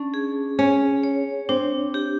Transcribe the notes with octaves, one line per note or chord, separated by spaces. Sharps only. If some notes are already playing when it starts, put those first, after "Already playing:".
Already playing: C#4 D4
G#4
C#4 G#4
C#5
C4 D4
G4